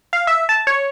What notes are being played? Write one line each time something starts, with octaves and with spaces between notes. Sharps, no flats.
F5
E5
A5
C#5